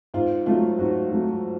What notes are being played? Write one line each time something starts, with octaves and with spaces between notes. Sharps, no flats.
G#2 F4
F#3 A3 F4
G#2 F#4
F#3 A3